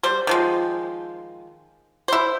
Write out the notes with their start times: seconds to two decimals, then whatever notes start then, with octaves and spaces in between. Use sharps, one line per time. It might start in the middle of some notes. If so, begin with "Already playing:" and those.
0.03 G3 C5
0.27 D#3 F3 G#3
2.08 E4 C5